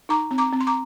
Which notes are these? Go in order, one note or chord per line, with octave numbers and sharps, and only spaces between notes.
D#4 A#5 D6
C4
A#5 D6
C4
C6
A#5 D6